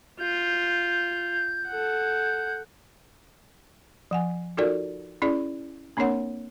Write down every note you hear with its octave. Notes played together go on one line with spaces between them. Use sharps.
F4 G6
A4 F#5
F3 F#5 G#5
D#4 F4 F#4 A4 A#4 D5
C#4 E4 G#4 D5
A#3 C4 D4 A#4 C#5 F#5